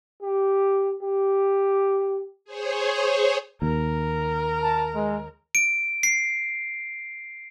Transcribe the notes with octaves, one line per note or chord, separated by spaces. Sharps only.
G4
G4
G#4 C5 C#5
D#2 A#4
A5
G#3
D7
C7